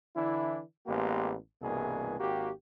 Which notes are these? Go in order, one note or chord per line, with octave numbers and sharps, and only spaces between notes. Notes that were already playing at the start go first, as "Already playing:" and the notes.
D3 E3 D4 E4
A1 G#3 A#3 B3 G4
C2 G2 B2 E3 A#3 G#4
G#1 A#3 F#4 G4